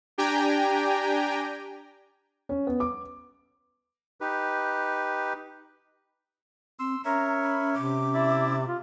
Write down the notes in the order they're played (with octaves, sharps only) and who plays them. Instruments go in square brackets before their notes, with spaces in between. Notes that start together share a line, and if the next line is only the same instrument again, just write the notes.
[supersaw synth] D4 G4 G5 G#5 A#5
[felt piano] C#4
B3
D6
[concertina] D#4 G4 B4
[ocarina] C4 [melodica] C6 E6
[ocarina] C#4 [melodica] A#4 C#5 E5 [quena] A#5
[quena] B5
[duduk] C3 [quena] D6
[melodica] E4 D5 E5
[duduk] F4